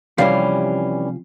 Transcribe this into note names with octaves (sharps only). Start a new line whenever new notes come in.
C3 E3 F3 G3 C#4 F5